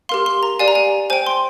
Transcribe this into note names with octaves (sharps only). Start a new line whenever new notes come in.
G4 A#4 F5 C6
C6
A#5
G4 D5 F5 G#5
A#5
G#5
C5 G5 G#5
C6